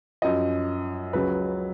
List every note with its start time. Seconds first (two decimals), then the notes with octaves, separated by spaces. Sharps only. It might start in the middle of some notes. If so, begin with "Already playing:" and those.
0.22 F#2 F3 D#5
1.13 C#2 C#3 F#3 B4